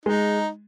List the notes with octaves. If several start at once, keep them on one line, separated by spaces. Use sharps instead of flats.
G#3 D#4